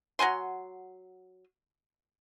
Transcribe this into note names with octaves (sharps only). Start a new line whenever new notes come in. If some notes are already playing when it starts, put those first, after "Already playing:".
F#3 F#5 G#5 C6